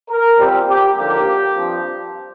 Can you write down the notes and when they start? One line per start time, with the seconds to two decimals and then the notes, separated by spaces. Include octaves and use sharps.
0.10 A#4
0.39 A#2 G3 C4 G4
0.69 G4
0.98 D#2 D3 F3 A#3 G4
1.56 G2 F3 C4